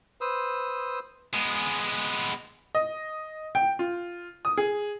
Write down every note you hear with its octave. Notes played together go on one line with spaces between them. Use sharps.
B4 C5 D#6 E6
G#3 B3
D#5
G5
F4
D#6
G#4